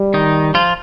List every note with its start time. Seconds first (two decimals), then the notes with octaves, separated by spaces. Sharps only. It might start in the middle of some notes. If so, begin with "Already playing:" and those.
Already playing: G3
0.14 D#3 D#4
0.54 F3 F4